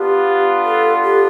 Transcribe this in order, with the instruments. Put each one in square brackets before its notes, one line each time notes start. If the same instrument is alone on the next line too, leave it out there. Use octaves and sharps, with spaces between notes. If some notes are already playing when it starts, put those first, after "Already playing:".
Already playing: [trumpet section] B3 D4 F4 [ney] G4
[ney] A4
G4